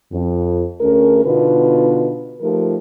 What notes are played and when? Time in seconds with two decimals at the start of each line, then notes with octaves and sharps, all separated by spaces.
0.12 F2
0.80 D2 A3 C#4 G#4 A#4
1.24 B2 D3 B3 D#4 F4 B4
2.41 F3 A3 D#4 F4 G4 A#4